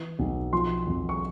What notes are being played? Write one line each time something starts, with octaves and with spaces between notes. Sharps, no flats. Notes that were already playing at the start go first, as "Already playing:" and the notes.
Already playing: E3
B1
F3 C6
F2
C#6